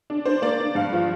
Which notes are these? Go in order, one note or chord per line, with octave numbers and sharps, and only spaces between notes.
D4
D4 C5
A#3 D5
D4
G2 F5
F3